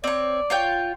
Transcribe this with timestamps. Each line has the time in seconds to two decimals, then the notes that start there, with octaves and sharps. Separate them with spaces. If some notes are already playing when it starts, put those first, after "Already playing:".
0.04 C4 C#5 D5
0.50 F4 C#5 G5